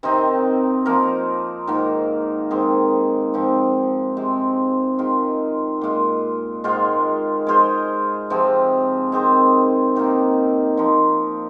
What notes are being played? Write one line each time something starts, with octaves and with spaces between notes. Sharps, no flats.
C3 D#3 C4 D#4
F3 A#3 F4 A#4
G#2 D#3 A#3
G#2 D#3 C4 G#4
G#2 F3 C4
C3 G#3 C4
D#3 G#3 F4
A#2 G#3 F4
G#2 D#3 G#3 F4
G#3 F4 G#4 C5
C3 F3 C4 G#4
D#3 C4 G#4 C5
C3 D#3 A#3
F3 A#3 D#4 C5